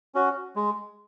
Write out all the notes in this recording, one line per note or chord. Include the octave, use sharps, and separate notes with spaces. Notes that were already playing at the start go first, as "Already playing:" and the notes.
C#4 F#4
G#3